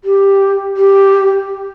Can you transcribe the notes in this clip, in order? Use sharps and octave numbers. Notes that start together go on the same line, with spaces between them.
G4
G4